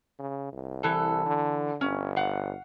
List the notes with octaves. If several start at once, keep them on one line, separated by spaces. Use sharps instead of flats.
C#3
C2
E3 A4
D3
G1 C#4
F5 F#5